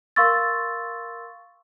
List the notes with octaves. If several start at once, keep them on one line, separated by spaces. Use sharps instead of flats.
A#4 F5 C6 C#6 E6 A6